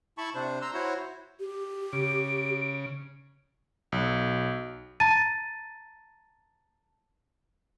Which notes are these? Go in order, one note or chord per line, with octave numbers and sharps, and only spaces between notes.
E4 A5 B5 C#6
C3 D4 C5
A#5 C6 E6
E4 F#4 C5 C#5
G4
C#3 D7
B1
A5 A#5 A6 D#7